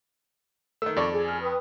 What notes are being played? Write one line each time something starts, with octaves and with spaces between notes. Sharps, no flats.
D#3 A3 E6
F2 A4 D5 C#6
G#4
F6
B4 G5 D#6